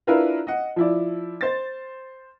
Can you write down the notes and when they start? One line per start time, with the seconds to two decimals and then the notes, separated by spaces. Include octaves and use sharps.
0.07 D4 E4 F4 A#4 B4 F5
0.47 D#5 F#5
0.76 F3 E4 D5
1.41 C5 A6